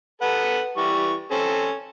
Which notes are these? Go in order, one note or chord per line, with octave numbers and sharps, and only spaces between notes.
A4 B4 F#5
E3 G3 C#6
C4 C#4 A4